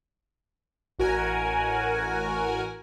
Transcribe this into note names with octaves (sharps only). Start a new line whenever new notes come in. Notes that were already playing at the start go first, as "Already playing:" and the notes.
A1 F#4 A#4 G#5